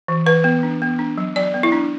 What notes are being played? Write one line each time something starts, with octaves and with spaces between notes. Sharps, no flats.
E3
E3 B4
B3
D4
B3
D4
F#3
F#3 D5
B3
E4
D4